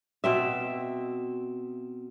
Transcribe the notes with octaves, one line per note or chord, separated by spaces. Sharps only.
B2 C4 E5